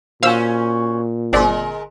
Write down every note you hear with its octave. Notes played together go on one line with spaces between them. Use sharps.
A#2 C#4 F#4 C5 F5 E6 F6
G1 G#3 C4 A#4 D5